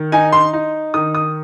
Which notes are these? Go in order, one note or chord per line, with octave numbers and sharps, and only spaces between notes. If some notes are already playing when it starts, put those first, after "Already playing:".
Already playing: D#3
D#4 G#5
C6
D#4
D#3 D#6
D#6